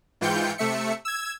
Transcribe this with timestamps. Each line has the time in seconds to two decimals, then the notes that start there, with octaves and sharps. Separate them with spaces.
0.21 G#2 E3 F4 G5 G6 C#7
0.58 C3 A3 E5 C#7
1.05 E6 G#6